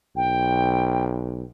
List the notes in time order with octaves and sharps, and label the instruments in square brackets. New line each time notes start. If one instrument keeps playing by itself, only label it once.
[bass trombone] B1 [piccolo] G5